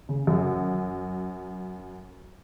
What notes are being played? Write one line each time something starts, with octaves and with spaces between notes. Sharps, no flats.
C#3
F#2